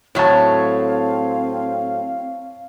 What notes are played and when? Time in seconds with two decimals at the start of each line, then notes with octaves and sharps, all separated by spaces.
0.15 A2 F#3 C4 C#5 F5 A5